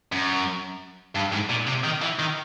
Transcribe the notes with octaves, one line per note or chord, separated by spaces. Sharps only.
F#2
G2
G#2
A#2
C3
D#3
E3
D#3